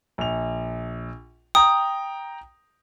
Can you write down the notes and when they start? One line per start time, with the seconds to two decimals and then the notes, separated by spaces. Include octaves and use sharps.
0.18 A#1 F7
1.55 G5 A#5 D#6